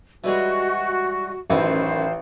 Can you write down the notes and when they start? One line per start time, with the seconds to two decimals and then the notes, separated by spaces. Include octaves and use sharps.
0.24 E3 G3 G#3 F#4
1.50 A1 F#2 D#3 E4 C5